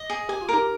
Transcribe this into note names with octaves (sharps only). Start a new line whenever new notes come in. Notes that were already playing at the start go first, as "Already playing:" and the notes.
Already playing: D#5
G#4
G4 G#5
F4
D#4 G4 A#4